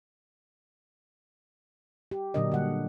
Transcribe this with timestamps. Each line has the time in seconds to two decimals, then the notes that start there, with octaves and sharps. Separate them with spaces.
2.11 G4
2.34 A#2 D3 F#3 D4 A#4 D#5
2.52 D3 G3 F#5